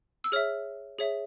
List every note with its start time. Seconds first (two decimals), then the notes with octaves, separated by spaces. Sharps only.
0.24 E6
0.32 G#4 C#5 E5 F6
0.99 G#4 C#5 E5